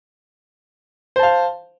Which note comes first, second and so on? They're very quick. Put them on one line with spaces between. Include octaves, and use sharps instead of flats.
C5 A5 F5